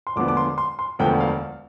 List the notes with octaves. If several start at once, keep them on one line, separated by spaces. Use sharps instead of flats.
C6
E1 D2 D3 F3 B3 D6
D6
C6
C6
C6
E1 D2 D3 F3 B3 G5
F5